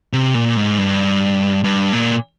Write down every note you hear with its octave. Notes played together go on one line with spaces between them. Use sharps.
C3
A#2
G#2
G2
G2
A#2